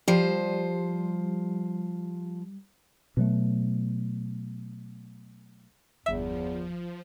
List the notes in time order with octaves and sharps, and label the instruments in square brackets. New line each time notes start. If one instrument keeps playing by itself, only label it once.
[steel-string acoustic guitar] F3 C5 [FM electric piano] G3
[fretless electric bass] B2 F#3 A3
[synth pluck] G1 E5 [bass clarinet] E2 [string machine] F3